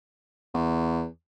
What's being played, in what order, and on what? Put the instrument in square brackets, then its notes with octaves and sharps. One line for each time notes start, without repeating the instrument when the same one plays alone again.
[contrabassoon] E2